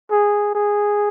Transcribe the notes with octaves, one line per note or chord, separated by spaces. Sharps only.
G#4
G#4